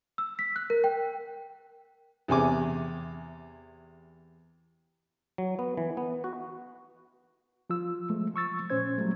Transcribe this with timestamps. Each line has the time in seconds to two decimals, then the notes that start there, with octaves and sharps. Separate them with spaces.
0.18 E6
0.39 B6
0.56 F#6
0.70 A#4
0.84 G5
2.28 E2 C3 G#5 D6
5.38 F#3
5.59 B3
5.77 E3
5.97 B3
6.24 F#4
7.70 F3 F4 E6
8.10 F3 G#3 A3
8.34 F3 C#6 E6 A6
8.70 A#2 C#4 C5 G#6
8.98 F#3 G3 A3